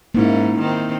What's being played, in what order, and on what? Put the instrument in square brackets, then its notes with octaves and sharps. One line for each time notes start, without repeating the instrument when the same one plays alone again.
[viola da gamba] G#2 C#4 [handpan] A#3 D#4 E4
[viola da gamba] D#3 C4